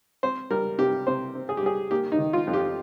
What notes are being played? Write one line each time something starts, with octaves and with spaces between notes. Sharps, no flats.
C4 C5
G3 A#4
C3 G4
C3 C5
C4
G#4
G4
G3 G#4
A#3 G4
D#4
D#3
F4
F2
G4